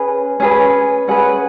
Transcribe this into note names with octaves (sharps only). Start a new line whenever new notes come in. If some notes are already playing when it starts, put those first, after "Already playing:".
Already playing: C#4 G#4 B4
C#4 G#4 B4
C#4 G#4 B4 F#5